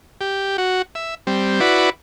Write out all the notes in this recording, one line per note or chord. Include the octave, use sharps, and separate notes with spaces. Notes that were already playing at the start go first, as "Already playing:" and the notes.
G4
F#4
E5
G3 C4
E4 F#4 B4 D5